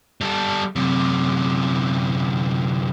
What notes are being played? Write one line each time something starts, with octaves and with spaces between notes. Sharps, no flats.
G3 A4
F#2 C3